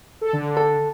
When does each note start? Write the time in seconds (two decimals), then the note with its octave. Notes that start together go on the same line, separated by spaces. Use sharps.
0.21 A4
0.33 D3
0.57 A4